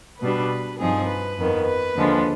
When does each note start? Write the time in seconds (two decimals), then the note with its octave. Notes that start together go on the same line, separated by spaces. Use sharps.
0.21 B2 G3 D4 B4
0.79 G2 F3 C4 D#4 G#4
1.08 B4
1.38 F2 D#3 B3
1.66 B4
1.95 D#2 D3 F3 G#3